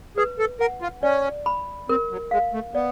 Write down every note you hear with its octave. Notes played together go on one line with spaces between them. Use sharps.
G#4 B4
A4
A#4 F#5
F4
C#4 D5
B5
C4 A#4
F#3
G#3 F5
A3
B3 D5